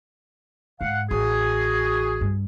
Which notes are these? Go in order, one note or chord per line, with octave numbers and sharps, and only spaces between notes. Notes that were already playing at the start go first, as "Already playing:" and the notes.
G#2 F5 F#5
A1 F#4 G#4
G2